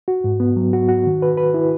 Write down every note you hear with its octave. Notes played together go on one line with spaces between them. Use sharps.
F#4
G#2
B3
F#3
F#4
F#4
D#3
B4
B4
E4